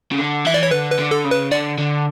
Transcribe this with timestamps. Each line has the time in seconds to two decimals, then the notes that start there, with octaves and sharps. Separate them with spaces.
0.11 C#3
0.18 D3
0.45 E3 E5
0.54 D5
0.63 C#5
0.71 D3 B4
0.92 B4
0.99 D3
1.11 A4
1.24 C#3
1.31 B4
1.51 D3 D5
1.78 D3